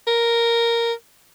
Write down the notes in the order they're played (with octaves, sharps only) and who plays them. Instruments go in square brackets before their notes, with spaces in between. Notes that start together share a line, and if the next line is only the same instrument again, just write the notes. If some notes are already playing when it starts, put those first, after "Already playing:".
[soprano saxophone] A#4